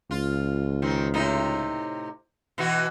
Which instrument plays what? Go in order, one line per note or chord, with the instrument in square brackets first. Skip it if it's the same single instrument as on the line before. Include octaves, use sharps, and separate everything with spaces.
[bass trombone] C#2 [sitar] F4
[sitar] D#3 C4
A2 C3 D#4
B2 E3 F#4